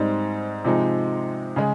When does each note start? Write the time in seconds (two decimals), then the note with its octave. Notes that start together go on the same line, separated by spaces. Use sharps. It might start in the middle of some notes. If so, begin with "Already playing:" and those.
Already playing: G#2 G3 C4 D#4
0.64 C3 F3 G#3 D#4
1.56 C#3 G#3